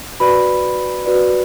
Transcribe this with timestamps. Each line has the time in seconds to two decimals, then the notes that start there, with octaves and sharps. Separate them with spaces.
0.20 F#4 B4 D5 B5
1.06 F#4 B4 D5